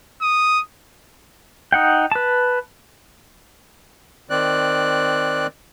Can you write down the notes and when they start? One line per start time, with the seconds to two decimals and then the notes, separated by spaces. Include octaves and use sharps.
0.22 D#6
1.72 D#4 F#5 G5
2.12 B4 A5
4.30 D#3 C4 D5 F#6